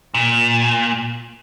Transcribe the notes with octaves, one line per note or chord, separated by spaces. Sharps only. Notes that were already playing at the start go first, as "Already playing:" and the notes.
A#2